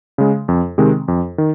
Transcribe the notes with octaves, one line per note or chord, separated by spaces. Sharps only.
C#3 G#3
F2
C3 D#3 G#3 C4
F2
D#3